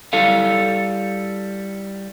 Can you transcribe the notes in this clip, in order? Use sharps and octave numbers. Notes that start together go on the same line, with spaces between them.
G3 E4 A4 F5